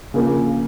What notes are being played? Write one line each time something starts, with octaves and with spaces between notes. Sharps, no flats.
C#3 F3 A#3